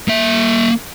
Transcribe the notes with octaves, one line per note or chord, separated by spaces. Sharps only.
A#3 E5